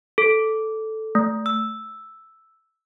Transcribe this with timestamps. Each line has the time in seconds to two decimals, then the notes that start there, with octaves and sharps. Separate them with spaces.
0.18 A4
1.15 A3
1.46 E6